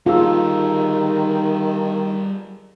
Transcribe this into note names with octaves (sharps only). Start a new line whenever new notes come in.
D#3 G3 F4 G#4 A4 F5 E6